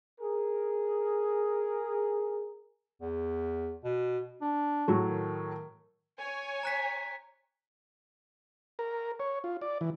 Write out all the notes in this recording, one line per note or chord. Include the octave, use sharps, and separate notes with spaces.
G#4 A#4
E2
B2
D4
A2 F#3 A3
D#3
C#5 G#5
A#5 F#6 B6
A#4
C#5
F4
D5
E3